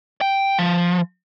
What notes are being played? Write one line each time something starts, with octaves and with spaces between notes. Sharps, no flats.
G5
F3